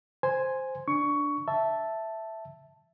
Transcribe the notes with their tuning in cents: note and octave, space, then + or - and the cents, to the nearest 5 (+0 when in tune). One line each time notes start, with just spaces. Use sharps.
C5 +0 G#5 +0
D4 +0 C#6 +15
E5 +0 A5 +0